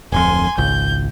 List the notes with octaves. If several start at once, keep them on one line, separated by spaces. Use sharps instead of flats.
D1 F2 G#5 C6
G#1 C#2 G6